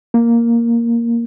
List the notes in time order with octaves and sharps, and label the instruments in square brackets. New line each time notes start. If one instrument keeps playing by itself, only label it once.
[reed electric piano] A#3